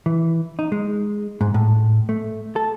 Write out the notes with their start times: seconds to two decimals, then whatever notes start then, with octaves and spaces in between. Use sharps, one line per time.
0.06 E3
0.59 D#4
0.72 G#3
1.41 G#2
1.54 A2
2.09 A3
2.56 A4